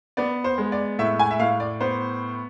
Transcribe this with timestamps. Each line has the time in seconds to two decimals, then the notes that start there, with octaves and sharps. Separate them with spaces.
0.17 B3 D5
0.44 C5
0.58 G#3
0.72 D5
0.99 A2 E5
1.19 G#5
1.31 E5
1.39 A2 F5
1.60 D5
1.80 B3 C5